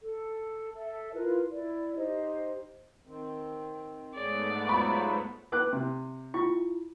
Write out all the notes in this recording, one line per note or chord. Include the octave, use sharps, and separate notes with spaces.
A4
A4 E5
E4 F4 A#4 B4
E4 D5
D#4 G4 C5 D#5
D#3 C4
G#2 A3 B3 G#4 C#5 D5
F#3 F4 C5 B5 C#6
B4 D6 F#6
C3
E4 F4 C#6